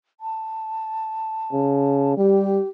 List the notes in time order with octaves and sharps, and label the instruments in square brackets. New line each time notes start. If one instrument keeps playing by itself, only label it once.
[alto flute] A5
[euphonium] C#3
[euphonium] G3 [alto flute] G4